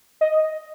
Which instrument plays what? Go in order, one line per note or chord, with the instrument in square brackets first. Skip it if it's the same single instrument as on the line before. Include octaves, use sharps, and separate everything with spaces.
[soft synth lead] D#5